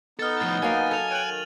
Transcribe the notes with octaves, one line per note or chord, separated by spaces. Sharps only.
B3 D#4 A4 F6 A6
A2 F3 A6
F#3 A#3 F5 G#5
A4 A6 F7
C#5 F#5 G5 D#7 F#7
D#3